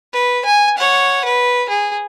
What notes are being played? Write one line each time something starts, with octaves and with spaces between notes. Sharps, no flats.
B4
G#5
C#5 F#5
B4
G#4